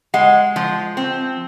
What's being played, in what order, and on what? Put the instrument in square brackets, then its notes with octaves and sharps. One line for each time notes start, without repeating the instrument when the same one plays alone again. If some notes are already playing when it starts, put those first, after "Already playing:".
[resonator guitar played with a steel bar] G#3 [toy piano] F#5
[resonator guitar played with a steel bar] F3
C4